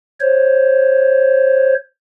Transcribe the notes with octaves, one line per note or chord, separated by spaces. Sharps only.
C5 C#5